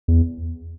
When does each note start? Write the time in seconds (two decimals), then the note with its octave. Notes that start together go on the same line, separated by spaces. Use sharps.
0.08 E2